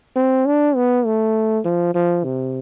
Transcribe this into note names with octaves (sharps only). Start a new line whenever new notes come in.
C4
D4
B3
A3
F3
F3
C3